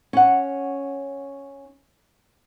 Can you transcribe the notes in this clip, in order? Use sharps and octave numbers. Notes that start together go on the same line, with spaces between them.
C#4 F#5